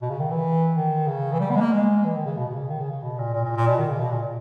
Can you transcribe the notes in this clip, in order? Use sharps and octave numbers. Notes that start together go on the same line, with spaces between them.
B2
C#3
D#3
E3
D#3
C#3
E3
G3
B3
G#3
A#3
G#3
E3
D#3
C#3
B2
B2
C#3
D#3
C#3
C#3
B2
A#2
A#2
A#2
A#2
B2
D#3
C#3
B2
A#2